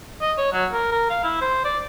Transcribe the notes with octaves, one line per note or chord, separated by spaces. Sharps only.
D#5
C#5
F#3
A#4
A#4
F5
E4
C5
D5